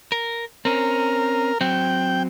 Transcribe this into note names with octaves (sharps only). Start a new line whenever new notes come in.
A#4
C4 C#4 A#4
F#3 C4 G5